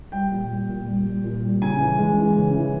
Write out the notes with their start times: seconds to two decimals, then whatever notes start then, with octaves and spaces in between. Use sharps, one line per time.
0.12 G3 G5
0.31 A#2
0.50 G3
0.69 A#2
0.87 G3
1.06 G3
1.24 A#2
1.43 G3
1.62 C#3 G#5
1.79 E3
1.98 G#3
2.17 E3
2.36 C#3
2.55 E3